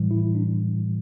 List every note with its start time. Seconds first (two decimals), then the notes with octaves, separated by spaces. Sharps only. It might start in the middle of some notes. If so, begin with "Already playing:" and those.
Already playing: A2 E3 G3
0.11 E4
0.35 D4